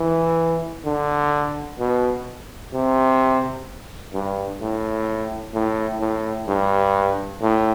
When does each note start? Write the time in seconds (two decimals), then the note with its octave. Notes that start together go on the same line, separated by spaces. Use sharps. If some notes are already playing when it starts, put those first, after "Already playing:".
Already playing: E3
0.86 D3
1.80 B2
2.73 C3
4.14 G2
4.61 A2
5.54 A2
6.01 A2
6.48 G2
7.42 A2